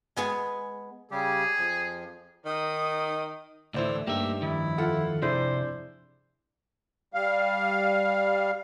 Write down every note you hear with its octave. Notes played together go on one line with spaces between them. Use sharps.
G#3 B3 G#4
C#3 G3 G4 G#4
F2 F3
D#3 D#4 D#6
D2 A2 E3 A3 E4 C5 D5
G2 A#3 D#4 G4 E5
F2 D#3 E4
F4 A4 F#5
C3 D4 E4 G#4 C5
G3 F5